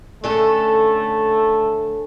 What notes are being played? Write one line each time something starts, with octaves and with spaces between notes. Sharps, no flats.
D3 A3 C#4 A4